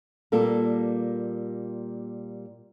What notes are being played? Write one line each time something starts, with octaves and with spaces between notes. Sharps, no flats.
A#2 G3 A#3 A4